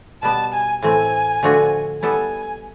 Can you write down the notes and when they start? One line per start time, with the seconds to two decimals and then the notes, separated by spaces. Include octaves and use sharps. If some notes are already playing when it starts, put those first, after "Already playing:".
0.23 B2 G3 B3 A5
0.53 G#5
0.82 A2 E3 A3 C4 G#5
1.43 D3 F3 A3 D4 F#4
2.03 G3 B3 E4 A4 G#5